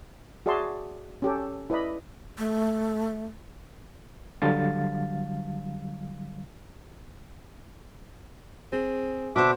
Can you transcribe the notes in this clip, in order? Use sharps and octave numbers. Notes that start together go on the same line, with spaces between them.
F#4 G#4 D5 E5 A5 C6
C#4 G4 A4
E4 B4 D5 D#5 B5
A3
D3 F#3 G3 F5 A6
C4 G#4
B2 D3 D4 F#4 C5 D5 E5 D6